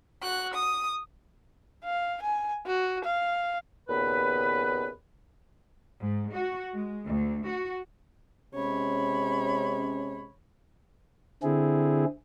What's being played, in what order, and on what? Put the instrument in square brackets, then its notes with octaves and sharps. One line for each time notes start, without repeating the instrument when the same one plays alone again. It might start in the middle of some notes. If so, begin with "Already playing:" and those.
[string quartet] F#4 F#6
D#6
[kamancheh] F5
G#5
F#4
F5
[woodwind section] D#2 A#2 C#3 B3 B4
[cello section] G#2
F#4
G#3
D2
F#4
[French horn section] C3 G#3 C#4 [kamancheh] C#5 B5
[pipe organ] D3 C4 E4 G#4